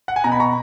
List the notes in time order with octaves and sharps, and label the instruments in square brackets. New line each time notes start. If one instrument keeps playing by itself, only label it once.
[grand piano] F#5
G#5
B2 A#5
B5
A#5 C#6